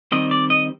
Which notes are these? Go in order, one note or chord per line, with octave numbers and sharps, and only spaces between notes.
D#3 G3 C4 D#5
D5
D#5